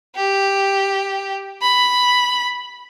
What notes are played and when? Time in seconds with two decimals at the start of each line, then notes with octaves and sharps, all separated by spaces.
0.16 G4
1.62 B5